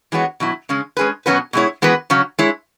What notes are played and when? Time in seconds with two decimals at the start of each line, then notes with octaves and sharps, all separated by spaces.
0.12 E3 G#3 B3 F#4 C#5
0.40 B2 F#3 E4
0.69 C#3 G#3 C#4
0.97 G#3 C#4 G#4 B4
1.26 B2 F#3 C#4 F#4 B4
1.53 B2 G#3 E4 C#5
1.82 E3 G#3 B3 F#4 B4
2.10 C#3 F#3 C#4
2.39 G#3 E4 C#5